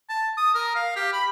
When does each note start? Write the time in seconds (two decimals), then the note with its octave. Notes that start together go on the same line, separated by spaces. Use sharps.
0.10 A5
0.37 D#6
0.55 A#4
0.76 F5
0.96 G4
1.13 B5